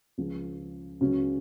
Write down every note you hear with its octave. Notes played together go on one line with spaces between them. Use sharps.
C#2 C#3 F3
C#2 C#3 F#3 C#4